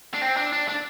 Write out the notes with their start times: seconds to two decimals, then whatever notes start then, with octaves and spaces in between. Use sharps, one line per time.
0.14 D4
0.22 C4
0.37 D4
0.53 D4
0.68 D4